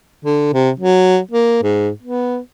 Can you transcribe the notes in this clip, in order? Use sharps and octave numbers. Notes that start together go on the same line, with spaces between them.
D3
C3
F#3
A#3
G#2
B3